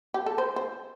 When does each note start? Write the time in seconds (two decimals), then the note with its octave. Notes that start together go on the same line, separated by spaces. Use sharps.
0.14 G4
0.26 A4
0.38 C5
0.56 C5